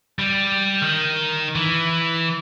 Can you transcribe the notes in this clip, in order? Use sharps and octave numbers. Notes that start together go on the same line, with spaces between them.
G3
D#3
E3